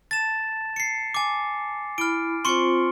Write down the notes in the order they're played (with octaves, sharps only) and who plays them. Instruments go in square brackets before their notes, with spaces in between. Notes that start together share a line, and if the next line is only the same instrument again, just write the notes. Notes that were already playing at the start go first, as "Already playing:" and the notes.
[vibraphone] A5 [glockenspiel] A6 E7
[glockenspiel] C7 C#7
G#5 D6
[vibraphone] E4 B5 [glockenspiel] F6 D7
[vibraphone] C4 F4 C5 [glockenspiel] C6 C#6 C#7